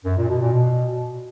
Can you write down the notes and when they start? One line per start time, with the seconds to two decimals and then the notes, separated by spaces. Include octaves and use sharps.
0.05 F#2
0.17 A#2
0.29 B2
0.41 A#2
0.53 B2